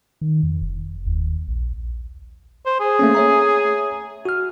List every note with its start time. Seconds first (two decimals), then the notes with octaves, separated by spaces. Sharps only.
0.21 D#3
0.43 F2
0.61 F1
1.06 D#2
1.48 A#1
2.66 C5
2.80 G#4
2.99 A3 A#3 C#4
3.15 C#5 E5 A#5
4.25 F#4 F6